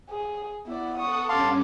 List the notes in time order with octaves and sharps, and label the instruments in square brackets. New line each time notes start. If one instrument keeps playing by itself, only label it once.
[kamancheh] G#4
[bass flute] B3 [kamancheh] E4 D5
[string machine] A4 F#5 [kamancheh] C#6 D#6
[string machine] G2 C#4 [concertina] F5 A5 C6 [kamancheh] D6